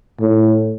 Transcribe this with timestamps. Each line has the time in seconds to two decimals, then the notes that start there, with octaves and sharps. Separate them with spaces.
0.20 A2